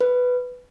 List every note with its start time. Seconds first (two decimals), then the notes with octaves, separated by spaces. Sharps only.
0.01 B4